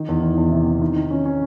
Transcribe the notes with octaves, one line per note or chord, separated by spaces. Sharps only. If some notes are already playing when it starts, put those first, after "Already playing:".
Already playing: D#3
E2
D#3
E2
C3
C3
D#3
D#3
C#4
C#4